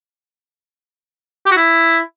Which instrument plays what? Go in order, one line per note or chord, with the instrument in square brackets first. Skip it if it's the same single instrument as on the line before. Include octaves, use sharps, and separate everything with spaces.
[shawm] G4
F#4
E4